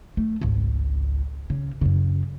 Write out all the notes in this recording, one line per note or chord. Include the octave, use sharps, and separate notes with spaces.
A3
G#1 C#2
C#3
F#2 C#3